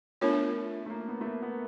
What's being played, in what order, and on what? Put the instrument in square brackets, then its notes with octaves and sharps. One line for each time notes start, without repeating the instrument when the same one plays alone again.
[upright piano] A3 [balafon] B3 D4 F4 A#4 C#5
[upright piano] A3
A#3
B3
A3
A#3
B3